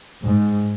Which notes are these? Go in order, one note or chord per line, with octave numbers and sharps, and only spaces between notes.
G#2